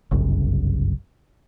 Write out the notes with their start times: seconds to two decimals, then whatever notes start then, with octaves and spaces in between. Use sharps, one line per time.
0.11 G1 C2 F#2 C#3